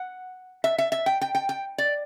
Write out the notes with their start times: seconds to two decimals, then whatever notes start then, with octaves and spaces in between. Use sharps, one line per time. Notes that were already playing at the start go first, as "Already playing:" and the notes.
Already playing: F#5
0.64 E5
0.78 E5
0.92 E5
1.06 G5
1.21 G5
1.35 G5
1.49 G5
1.78 D5